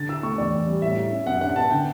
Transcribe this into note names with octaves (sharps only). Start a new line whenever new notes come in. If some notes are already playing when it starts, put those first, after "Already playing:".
Already playing: D3 A6
E4 E6
A3 C#6
E2 D5
E2
G3
A2 E5
E4
C#4
F#2 F#5
D4 F#5
B3 A5
D3 G5